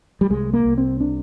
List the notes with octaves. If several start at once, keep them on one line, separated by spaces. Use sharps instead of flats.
G3
C2 G#3
A#3
C2
C4
C3 D4